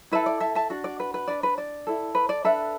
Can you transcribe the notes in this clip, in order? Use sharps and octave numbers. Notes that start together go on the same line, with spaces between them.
E4 A4 B4 E5
D5
E5 A5
E5 A5
D4 F#4
D5
B4
B4
D4 B4 D5
B4
D5
E4 A4
B4
D5
D4 A4 B4 E5